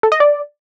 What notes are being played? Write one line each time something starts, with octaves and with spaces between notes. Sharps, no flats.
A4
D#5
D5